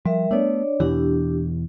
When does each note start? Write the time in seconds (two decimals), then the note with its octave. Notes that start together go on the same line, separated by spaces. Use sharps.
0.05 F3 G3 A#4 E5
0.31 A3 B3 D4 C#5 D5
0.80 E2 B2 E3 D4 E4 G4